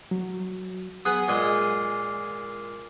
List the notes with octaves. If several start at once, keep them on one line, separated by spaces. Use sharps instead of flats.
F#3
B3 G#4 B5 D#6 F#6
A#2 G#3 G#5